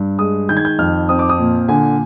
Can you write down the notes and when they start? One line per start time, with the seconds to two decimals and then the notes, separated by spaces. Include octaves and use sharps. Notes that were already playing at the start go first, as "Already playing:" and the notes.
Already playing: G2
0.18 G#3 D#6
0.49 D#3 G6
0.57 G#6
0.65 G6
0.79 F2 F6
1.09 C4 D#6
1.19 D6
1.29 D#6
1.39 A#2
1.68 D3 G#5